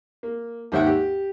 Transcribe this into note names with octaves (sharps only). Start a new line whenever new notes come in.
A#3
D#2 G#2 C5 E5 F#5 G5
G4